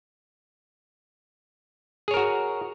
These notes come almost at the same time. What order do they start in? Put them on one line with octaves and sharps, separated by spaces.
G#4 C#5 A#4 F#4